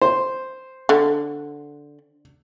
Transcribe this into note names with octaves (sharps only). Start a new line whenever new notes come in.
C5
D3